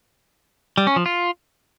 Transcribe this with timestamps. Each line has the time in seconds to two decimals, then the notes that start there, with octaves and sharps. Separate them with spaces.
0.78 G3
0.87 C#4
0.96 F3
1.06 F4